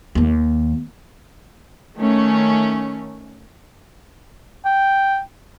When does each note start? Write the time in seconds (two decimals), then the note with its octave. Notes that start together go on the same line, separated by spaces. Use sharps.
0.15 D#2 A#3
1.96 D#3 A3 C#4
4.65 G5